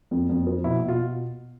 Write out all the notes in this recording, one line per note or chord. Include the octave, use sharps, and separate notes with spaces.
F2
F2
F3
B2 E4
B2
F4